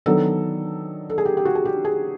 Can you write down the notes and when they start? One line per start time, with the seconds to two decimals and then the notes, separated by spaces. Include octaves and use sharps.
0.06 D#3 F#3 B3 D4 A4
1.10 A4
1.18 G#4
1.25 G4
1.37 G4
1.45 F#4
1.55 G#4
1.65 G4
1.85 G#4